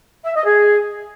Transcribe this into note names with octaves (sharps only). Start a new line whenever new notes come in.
E5
D#5
G#4